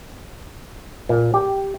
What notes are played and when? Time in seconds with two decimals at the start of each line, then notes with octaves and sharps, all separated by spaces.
1.09 A#2
1.34 G4